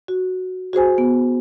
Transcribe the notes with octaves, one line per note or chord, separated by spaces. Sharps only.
F#4
F#4 G#4 C5 G#5
B3